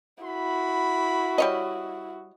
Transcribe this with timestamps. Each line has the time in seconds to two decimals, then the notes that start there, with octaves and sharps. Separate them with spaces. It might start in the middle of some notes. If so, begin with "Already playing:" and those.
0.24 E4 F#4 B5
1.38 G3 C#5 D#5